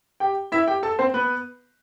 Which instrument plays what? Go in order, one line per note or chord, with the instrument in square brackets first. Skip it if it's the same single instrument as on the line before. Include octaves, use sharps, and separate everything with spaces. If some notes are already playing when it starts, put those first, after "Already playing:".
[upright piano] G4 G5
E4 E5
G4 G5
A4 A5
C4 C5
B3 B4